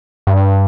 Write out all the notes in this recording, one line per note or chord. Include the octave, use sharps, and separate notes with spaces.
G2